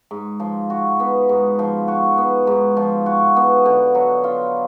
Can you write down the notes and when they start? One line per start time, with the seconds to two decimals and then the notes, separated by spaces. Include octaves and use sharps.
0.11 G#2
0.40 F3
0.70 F#4
1.00 B3
1.29 G#2
1.59 F3
1.88 F#4
2.18 B3
2.47 G#2
2.77 F3
3.06 F#4
3.36 B3
3.66 D3
3.95 F#3
4.24 F4